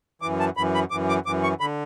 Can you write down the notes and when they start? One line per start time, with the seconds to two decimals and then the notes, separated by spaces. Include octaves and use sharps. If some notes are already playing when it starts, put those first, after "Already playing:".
0.22 F#2 E3 D6
0.40 A5
0.57 F#2 E3 B5
0.74 B5
0.91 F#2 E3 D6
1.09 D6
1.26 F#2 E3 D6
1.43 C#6
1.60 D3 B5